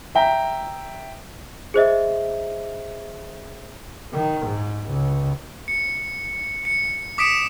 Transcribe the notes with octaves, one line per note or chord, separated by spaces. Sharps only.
E5 G5 A#5
G#4 C5 D#5 E5
D#3
G#2
C#2
C#7
C#7
D6 D#6 B6 C#7 D7 E7